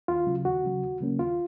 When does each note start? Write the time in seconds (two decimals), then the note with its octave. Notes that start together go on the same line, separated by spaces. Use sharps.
0.08 D#2 F4
0.27 C#3 F#3
0.45 D#2 F#4
0.64 C#3 F#3
0.83 D#2
1.01 C#3 F#3 A#3 C#4
1.19 D#2 F4